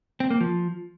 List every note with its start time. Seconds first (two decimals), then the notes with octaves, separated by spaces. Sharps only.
0.20 C4
0.30 A#3
0.41 F3